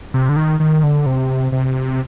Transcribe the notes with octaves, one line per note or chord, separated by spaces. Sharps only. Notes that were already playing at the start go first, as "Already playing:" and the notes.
C3
D3
D#3
D#3
D3
C3
C3